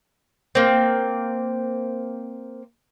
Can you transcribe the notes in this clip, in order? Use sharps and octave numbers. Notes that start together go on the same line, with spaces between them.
A#3 C4